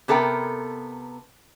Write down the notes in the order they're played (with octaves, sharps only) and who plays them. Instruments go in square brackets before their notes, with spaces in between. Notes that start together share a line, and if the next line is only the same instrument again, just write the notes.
[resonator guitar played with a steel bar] C3 B3 A4 A#4 G5